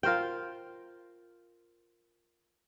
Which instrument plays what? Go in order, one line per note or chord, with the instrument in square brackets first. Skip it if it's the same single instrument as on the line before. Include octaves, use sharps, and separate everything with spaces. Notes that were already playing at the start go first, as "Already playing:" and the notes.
[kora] F4 A#4 C5 G5